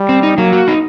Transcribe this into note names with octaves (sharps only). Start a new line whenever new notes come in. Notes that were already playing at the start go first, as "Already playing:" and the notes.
Already playing: G3
C4
D#4
F#3 A#3
F#4
D#4